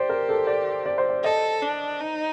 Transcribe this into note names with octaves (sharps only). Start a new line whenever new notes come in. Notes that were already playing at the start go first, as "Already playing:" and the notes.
Already playing: G4 C5 D5
A#4
A4
D5
D5
C5
D5
A4 D#5
D4
D#4